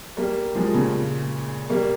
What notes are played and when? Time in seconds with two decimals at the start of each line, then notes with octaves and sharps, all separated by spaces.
0.17 G3 A#3
0.55 F3 G#3
0.74 A#2 C#3
1.69 G3 A#3